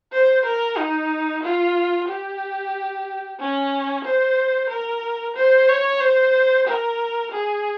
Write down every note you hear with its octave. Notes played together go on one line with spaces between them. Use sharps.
C5
A#4
D#4
F4
G4
C#4
C5
A#4
C5
C#5
C5
A#4
G#4